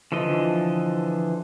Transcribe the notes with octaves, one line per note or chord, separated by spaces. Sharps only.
D3 E3 F3 D#5